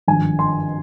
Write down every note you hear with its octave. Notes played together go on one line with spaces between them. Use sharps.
G#1 G2 F3 G#5
C6